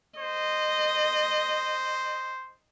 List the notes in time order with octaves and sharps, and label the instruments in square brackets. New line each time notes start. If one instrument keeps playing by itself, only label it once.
[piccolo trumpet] C5 [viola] D#5